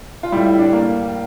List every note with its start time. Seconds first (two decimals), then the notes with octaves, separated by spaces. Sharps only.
0.23 F4
0.32 A2 G3 E4
0.46 E4
0.59 D4
0.73 A#3